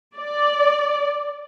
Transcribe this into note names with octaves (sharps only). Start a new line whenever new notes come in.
D5